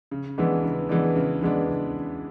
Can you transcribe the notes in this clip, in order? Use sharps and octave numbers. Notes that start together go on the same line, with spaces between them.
C#3
E3 G#3 B3 D4
C#3
E3 G#3 B3 D4
C#3
E3 G#3 B3 D4
C#3